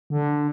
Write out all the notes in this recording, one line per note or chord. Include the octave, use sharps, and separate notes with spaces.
D3